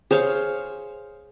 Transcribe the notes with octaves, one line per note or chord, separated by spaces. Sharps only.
G#4 C5 C#5 F5